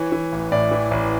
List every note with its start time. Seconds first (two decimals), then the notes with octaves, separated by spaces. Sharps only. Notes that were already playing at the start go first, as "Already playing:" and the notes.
Already playing: E3 C#5
0.12 E3
0.32 A1
0.52 A2 D5
0.71 E3
0.91 A1